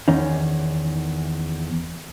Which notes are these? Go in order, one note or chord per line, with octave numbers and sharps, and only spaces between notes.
E2 D#3 C#4 D#4